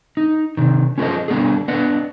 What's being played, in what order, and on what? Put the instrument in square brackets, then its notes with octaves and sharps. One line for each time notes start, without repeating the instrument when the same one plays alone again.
[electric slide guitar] D#4
C3 D#3
C#4 F4 G#4 A#4 C5 D#5
D3 G3 B3 D4 G4 G#4
B3 D4 B4 D#5 F#5